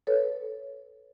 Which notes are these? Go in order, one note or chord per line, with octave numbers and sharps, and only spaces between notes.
A4 B4 C#5